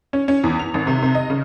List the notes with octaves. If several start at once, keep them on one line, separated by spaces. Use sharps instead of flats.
C#4
C#4
E2
F7
G#1
C3
C3
D#5
C#3